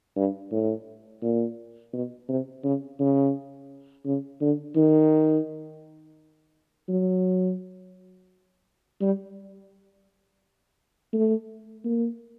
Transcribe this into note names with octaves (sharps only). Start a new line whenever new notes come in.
G2
A2
A#2
B2
C3
C#3
C#3
C#3
D3
D#3
F#3
G3
A3
A#3